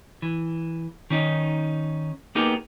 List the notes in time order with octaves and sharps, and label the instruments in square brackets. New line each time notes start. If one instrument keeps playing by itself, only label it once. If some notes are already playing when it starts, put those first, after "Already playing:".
[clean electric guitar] E3
D#3 C#4 D#4
A#3 B3 D#4 G4 G#4 A#4